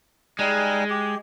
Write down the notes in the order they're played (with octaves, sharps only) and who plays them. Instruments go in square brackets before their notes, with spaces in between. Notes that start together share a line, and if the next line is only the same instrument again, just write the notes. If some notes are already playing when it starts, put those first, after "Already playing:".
[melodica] G3 D#4 G#5 [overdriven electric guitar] G#3
[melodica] G4